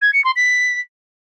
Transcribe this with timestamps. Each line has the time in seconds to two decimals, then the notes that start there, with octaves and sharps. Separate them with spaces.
0.01 G#6
0.13 C#7
0.24 C6
0.36 B6